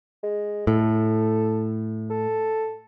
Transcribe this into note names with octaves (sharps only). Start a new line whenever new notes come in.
G#3
A2 A4
A4